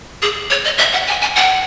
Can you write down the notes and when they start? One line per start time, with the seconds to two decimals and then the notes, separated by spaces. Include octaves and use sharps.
0.22 G#4
0.50 C#5
0.65 D#5
0.78 E5
0.93 F#5
1.07 G#5
1.22 G#5
1.36 F#5